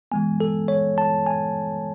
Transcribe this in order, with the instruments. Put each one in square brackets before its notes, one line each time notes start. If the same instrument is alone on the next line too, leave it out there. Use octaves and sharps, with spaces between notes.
[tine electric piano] E3 G#3 B3 G#5
A4
C#5
A5
G#5